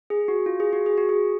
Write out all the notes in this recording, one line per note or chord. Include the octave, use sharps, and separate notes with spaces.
G#4
F#4
F4
G#4
F#4
G#4
F#4
G#4